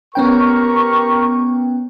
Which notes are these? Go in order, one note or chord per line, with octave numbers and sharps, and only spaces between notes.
B3 C#4 G4 A#4 G5 C#6